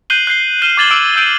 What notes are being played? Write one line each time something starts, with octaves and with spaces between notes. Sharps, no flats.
F#6 G6 C7 D#7 F#7 G7
F#6 G6 C7 G7
F6 F#6 D#7 E7 G7
D6 G#6 A6 F#7 G7
D6 E6 D7
E6 G6 D7 D#7